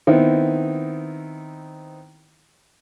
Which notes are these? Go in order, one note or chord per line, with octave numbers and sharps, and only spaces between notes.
D#3 B3 C4 D#4 E4